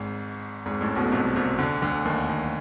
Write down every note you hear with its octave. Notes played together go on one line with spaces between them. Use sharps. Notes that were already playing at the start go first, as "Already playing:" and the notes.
Already playing: G#1 G#2
G#1 G#2
A1 A2
B1 B2
C2 C3
C2 C3
D2 D3
D2 D3
D#2 D#3
D#2 D#3